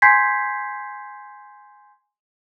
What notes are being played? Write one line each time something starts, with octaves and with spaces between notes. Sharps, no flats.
G#5 C6 G6 G#6 B6 C7